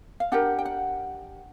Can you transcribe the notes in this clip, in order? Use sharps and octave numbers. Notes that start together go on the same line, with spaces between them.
F5
D4 G4 A#4 F#5
G5
F#5